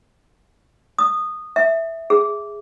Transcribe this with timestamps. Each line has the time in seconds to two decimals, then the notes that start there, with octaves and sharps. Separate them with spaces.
0.99 D#6
1.56 E5
2.10 G#4